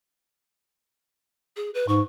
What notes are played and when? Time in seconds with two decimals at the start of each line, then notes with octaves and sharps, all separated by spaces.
1.57 G#4
1.74 B4
1.88 G#2 C#6